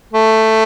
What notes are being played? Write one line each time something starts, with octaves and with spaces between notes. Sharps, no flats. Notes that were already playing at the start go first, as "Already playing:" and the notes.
A3